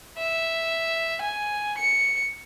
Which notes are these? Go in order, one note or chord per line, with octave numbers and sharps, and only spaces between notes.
E5
G#5
C#7